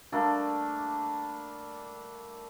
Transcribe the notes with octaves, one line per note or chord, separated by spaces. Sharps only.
G3 A3 A#3 D4